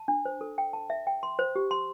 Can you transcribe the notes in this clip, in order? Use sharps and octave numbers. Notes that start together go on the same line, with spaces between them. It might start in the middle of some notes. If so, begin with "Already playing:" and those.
Already playing: A5
D4
C5
A4
G5
A5
E5
G5
C6
C5
G4
C6